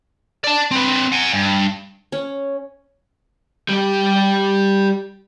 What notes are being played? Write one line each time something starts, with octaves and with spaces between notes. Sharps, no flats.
D5 A5
C4 B4
F#5 G#5
G2
C#4
G3 G4